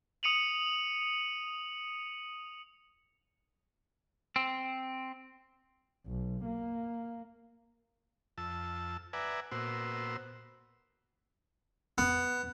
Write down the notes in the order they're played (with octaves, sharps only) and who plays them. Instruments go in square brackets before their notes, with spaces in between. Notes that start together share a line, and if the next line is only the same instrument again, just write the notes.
[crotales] D#6 C#7 D#7 F7 F#7
[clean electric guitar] C4
[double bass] B1
A#3
[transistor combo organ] F2 A5 E6
B4 D5 E5 F#5 G#5 A#5
A#2 B3 F#4 C5 E6
[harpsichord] B3